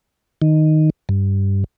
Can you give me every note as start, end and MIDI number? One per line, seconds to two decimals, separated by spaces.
0.42 0.90 51
1.09 1.64 43